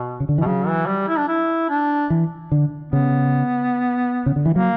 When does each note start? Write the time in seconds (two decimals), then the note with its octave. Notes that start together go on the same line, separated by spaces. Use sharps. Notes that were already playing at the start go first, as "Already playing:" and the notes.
Already playing: B2
0.20 C#3
0.29 D3
0.38 E3
0.41 B2
0.46 C#3 F#3
0.67 E3
0.87 G3
1.08 E4
1.18 D4
1.28 E4
1.70 D4
2.10 E3
2.52 D3
2.92 C#3 B3
4.26 C#3
4.36 D3
4.46 E3
4.56 F#3 A#3